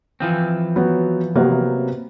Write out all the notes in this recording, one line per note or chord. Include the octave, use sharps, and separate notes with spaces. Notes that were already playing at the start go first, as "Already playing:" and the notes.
E3 F3 C4
F#3 B3
C3 F#3 A#3 B3